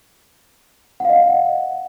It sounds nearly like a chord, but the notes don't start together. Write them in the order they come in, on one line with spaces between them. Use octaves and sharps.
F#5 F5 D#5